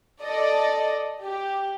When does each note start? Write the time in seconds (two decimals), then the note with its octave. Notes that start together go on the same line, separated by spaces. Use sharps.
0.22 A4 D5 D#5
1.22 G4